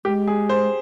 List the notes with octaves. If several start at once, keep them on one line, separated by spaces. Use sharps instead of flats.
G#3 G4
G#4
C5